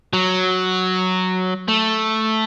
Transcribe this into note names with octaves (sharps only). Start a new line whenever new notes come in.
F#3
A3